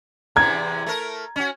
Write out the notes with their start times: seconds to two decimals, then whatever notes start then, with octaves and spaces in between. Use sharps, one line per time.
0.36 E2 C3 E3 A#5 G#6
0.86 A3 A#4
1.36 C#4 F#4